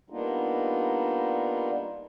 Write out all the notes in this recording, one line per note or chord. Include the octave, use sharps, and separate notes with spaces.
G3 A#3 B3 D4 D#4 F4